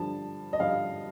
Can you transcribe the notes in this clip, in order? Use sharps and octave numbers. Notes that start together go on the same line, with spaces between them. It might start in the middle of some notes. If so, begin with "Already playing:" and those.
Already playing: G2 D3 F3 A5
D#5
G2 D3 F3 F5